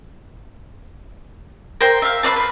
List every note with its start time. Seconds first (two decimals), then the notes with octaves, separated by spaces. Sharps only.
1.80 A#4 C5 G5
2.02 E5 F5
2.23 B4 C5 D5 A5
2.36 B4